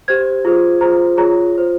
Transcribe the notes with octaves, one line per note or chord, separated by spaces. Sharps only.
G4 C5 G#6
F4 G#4 C5
F4 G#4 C5 A#5
F4 G#4 C#5 A#5
F4 C5